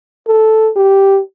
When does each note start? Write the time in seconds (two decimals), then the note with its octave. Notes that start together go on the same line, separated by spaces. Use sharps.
0.28 A4
0.76 G4